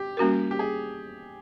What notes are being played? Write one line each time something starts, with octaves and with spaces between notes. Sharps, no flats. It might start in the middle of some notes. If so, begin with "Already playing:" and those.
Already playing: G4
G3 A#3 C#4 F#4 A#4
G4
G#4